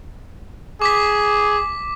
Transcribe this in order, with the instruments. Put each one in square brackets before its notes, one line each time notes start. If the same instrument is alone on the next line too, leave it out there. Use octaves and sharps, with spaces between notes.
[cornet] G#4 [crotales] D6 B6